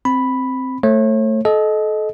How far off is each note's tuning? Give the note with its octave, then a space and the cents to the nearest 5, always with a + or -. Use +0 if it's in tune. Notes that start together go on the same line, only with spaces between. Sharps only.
C4 +0 B5 +0
A3 +10 C#5 -40
A4 -30 D#5 +0